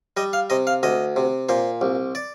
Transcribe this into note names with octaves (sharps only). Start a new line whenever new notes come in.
G3 D#5
F5
C3 D#5
F5
D2 D#5
C3
A#2 C5
C2
D5